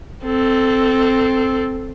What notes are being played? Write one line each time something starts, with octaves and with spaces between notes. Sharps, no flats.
C4 A4